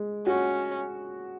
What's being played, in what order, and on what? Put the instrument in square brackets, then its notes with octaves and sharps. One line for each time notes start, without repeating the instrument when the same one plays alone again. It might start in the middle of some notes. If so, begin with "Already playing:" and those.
Already playing: [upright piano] G#3
[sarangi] C#4 [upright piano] F#4